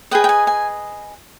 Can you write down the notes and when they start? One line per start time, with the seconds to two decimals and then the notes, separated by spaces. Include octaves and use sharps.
0.11 G#4 B4 D#5 G5
0.24 G5
0.29 G#5
0.47 G#5